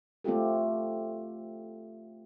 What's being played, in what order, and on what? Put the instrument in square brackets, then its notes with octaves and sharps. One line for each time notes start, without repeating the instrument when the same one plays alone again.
[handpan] A3 C4 F4 G4 A4